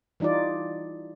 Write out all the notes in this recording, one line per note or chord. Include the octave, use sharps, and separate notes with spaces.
E3 G3 D#4 F4 D5